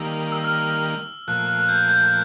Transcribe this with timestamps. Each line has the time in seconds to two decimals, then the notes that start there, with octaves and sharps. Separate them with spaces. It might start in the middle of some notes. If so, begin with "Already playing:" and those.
Already playing: D#3 G3 A#3 E6
0.32 E6
0.44 F6
1.28 A#2 F3 A3 F#6
1.48 F#6
1.59 F#6
1.69 G6
1.89 G6